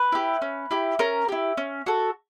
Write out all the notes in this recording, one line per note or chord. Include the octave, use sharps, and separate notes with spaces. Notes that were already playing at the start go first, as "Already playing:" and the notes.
Already playing: B4
E4 G4
C#4
E4 G4
C#4 A#4
E4 G4
C#4
F#4 A4